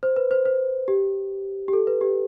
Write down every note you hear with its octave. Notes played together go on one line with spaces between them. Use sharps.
C5
B4
C5
C5
G4
G4
A4
B4
G4